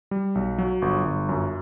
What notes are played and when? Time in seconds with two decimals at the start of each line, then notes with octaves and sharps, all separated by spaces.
0.11 G3
0.35 B1
0.58 F#3
0.82 G1
1.05 G1
1.29 F#2